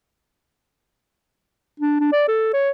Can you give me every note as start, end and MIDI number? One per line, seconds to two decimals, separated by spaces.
1.80 1.96 62
2.00 2.07 62
2.12 2.25 74
2.28 2.51 69
2.53 2.70 73